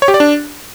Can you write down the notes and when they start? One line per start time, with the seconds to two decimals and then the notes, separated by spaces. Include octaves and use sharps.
0.02 C#5
0.08 G4
0.14 D5
0.20 D4